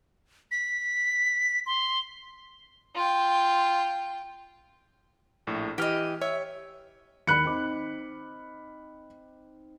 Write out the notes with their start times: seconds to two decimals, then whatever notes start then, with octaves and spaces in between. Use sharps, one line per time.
0.51 B6
1.66 C6
2.95 F4 G5
5.47 A#1 A2
5.78 E3 G4 D#5 F6
6.21 C#5 E5
7.27 D#2 B5 F#6 C#7
7.45 C4 D#4 D6